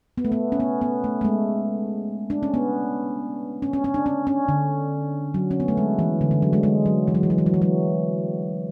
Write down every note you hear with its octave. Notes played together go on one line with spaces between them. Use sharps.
B3
A3
B3
C#4
B3
B3
A3
A3
G#3
D4
C#4
B3
C#4
C#4
C#4
D4
C#4
C#4
D3
F#3
C#4
B3
A3
G#3
E3
D3
D3
F#3
G#3
G#3
F#3
E3
F#3
E3
F#3
E3
F#3
E3
F#3